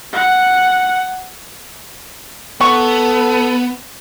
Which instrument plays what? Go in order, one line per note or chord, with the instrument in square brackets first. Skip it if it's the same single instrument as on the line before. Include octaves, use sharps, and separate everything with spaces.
[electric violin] F#5
[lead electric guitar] B3 [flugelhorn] A4 [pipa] F#5 C#6